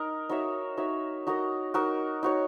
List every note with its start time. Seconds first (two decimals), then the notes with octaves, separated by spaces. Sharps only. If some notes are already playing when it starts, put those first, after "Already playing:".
Already playing: D#4 A#4 D#5
0.29 D#4 F#4 C#5 E5
0.77 D#4 F#4 C#5 E5
1.27 D#4 F#4 A#4 D#5
1.74 D#4 F#4 A#4 D#5
2.23 D#4 F#4 C#5